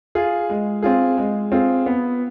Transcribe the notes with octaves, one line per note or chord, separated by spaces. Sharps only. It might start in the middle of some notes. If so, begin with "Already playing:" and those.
F4 G#4
G#3
C4 F4 G#4
G#3
C4 F4 G#4
B3